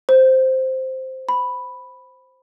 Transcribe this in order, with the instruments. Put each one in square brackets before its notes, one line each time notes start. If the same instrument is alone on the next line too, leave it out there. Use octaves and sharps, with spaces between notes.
[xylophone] C5
B5